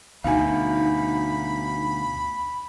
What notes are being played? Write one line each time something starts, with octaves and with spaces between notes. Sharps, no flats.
D2 B2 D#4 F5 G#5 B5